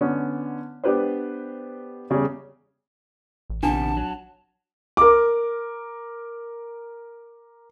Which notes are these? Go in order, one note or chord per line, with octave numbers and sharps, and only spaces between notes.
D3 B3 C#4
B3 D4 G4 B4 C5
E2 C#3 G3 G#4
A1
A#1 C3 D#3 B3 D4 A5
F#3
A#4 D6